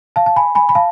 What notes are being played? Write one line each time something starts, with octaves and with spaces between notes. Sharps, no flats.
F5 A5
A5
G#5 B5
G#5 B5
B5
F5 A5